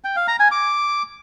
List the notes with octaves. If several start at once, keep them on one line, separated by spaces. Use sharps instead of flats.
G5
F5
A#5
G#5
D6